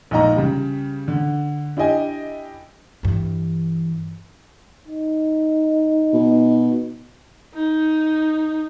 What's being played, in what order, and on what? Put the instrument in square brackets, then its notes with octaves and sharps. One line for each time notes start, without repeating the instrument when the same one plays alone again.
[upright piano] A#1 G#2 D#4 D#5 A#5
C#3 G3
D3
D4 E4 G4 D#5 G#5
[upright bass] G2 E3
[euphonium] D#4
[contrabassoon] B2
[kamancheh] D#4